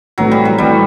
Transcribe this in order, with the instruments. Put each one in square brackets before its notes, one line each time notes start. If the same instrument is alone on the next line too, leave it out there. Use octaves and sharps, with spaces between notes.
[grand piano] A2 E3 A3 C4 [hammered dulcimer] F#3
[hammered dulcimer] G3
F#3
[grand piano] A2 E3 A3 C4 [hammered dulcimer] G3